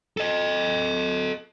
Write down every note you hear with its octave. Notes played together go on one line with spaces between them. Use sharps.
A4 D#5